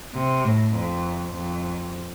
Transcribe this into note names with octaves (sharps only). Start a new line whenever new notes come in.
C3
A2
F2
F2